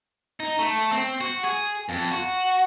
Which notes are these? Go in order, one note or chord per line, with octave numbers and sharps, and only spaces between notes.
D#4
A3
C4
F#4
G#4
F2
F#4